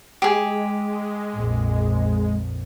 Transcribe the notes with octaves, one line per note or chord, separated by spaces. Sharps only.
G#3 G4 G#4
A#1 F2